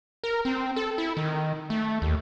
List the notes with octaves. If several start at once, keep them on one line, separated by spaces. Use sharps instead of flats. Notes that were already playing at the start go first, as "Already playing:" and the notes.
A#4
C4
A4
E4
D#3
A3
D#2